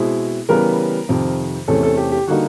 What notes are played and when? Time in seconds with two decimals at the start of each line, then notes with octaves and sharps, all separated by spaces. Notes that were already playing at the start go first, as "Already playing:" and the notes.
Already playing: B2 G#3 C4 E4 C5
0.49 C#3 E3 G3 B3 A#4
1.09 F2 C3 D#3
1.68 E2 C3 E3 A3 C#4 A4
1.83 A4
1.97 G4
2.12 G4
2.28 D3 G3 A#3 D#4 F#4